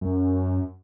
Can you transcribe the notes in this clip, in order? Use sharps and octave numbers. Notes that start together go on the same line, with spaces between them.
F#2